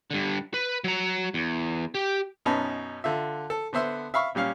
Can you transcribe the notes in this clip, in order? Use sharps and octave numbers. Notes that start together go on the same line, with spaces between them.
G2 D3
B4
F#3 A#5
E2
G4
F#2 B2 C#4 D#4 B4 A5
D3 F4 E5
A4
D3 B3 C5 E5 C6
E5 F5 B5 C#6
A#2 G3 C#4 F5